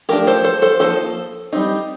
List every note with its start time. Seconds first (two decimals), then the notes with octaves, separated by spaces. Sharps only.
0.09 F3 A3 D4 G4 A#4
0.27 A4 C5
0.44 A4 C5
0.62 A4 C5
0.80 F3 A#3 D#4 A4 C5
1.52 G3 C4 D#4